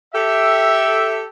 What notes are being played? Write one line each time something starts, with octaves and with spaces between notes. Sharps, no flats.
G4 A4 E5